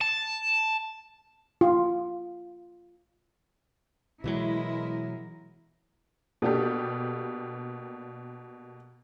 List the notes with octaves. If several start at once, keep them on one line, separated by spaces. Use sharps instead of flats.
A5
F4
B2 E3 F#3 G#3 E4 A#4
B2 A#3 D4 G4 A4